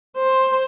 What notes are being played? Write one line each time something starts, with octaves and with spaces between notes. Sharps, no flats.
C5